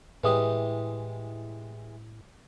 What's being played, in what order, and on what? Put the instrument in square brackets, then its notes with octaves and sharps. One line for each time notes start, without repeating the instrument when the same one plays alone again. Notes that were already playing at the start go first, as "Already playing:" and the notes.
[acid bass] A2 [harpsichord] E3 G#3 G4 [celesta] B4 E5 D#6